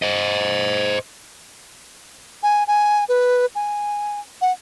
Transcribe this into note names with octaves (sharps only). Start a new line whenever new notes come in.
C5 D#5
G#5
G#5
B4
G#5
F#5